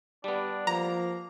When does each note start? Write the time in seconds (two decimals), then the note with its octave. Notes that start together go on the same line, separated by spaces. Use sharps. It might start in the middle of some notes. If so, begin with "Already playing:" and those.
0.24 G3 B3 D4
0.67 F3 A#3 A#5